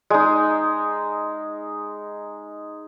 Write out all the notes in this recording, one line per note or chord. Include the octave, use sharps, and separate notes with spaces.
G#3 D#4